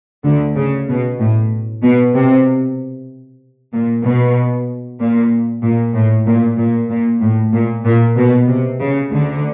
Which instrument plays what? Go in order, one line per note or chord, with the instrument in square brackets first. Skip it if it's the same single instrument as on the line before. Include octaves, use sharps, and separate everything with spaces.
[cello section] D2 D3
C#3
B2
A2
B2
C3
A#2
B2
A#2
A#2
A2
A#2
A#2
A#2
A2
A#2
A#2
B2
C3
C#3
D2 D3